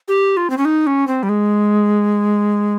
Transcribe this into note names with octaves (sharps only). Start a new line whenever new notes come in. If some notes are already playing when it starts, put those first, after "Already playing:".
G4
F4
C4
C#4
D#4
C#4
C4
G3
G#3